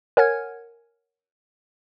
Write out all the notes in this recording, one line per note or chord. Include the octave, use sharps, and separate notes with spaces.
A#4 C#5 F#5 G#5 F6 G#6